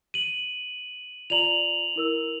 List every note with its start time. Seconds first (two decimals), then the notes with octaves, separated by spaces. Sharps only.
0.14 D#7 F#7
1.30 F4 D5 A#5 F7 F#7
1.96 E4 A#4 E6